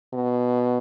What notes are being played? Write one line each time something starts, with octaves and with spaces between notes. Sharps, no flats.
B2